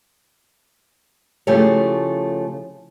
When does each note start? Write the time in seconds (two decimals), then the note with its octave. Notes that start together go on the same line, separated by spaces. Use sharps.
1.47 C#3 F3 A3 E4 G4 C#5